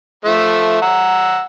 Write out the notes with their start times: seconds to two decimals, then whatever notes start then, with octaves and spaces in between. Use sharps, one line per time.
0.25 F3 A3 E5
0.82 F#5 A#5 E6